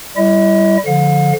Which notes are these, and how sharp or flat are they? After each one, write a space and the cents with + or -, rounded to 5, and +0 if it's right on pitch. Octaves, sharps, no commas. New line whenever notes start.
G3 -10 E4 +15 D#5 +45
D3 -15 F3 +0 F5 +45